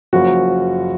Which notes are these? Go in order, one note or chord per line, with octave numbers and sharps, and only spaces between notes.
F#1 F#2 F3 F#4